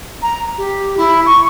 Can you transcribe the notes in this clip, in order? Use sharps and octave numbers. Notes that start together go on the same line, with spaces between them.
A#5
G4
E4
C#6